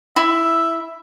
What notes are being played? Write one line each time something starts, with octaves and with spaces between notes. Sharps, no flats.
E4 E5